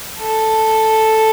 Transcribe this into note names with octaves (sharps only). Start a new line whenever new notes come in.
A4